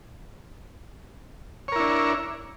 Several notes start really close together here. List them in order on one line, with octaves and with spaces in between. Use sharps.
C#5 A#4 E4 D4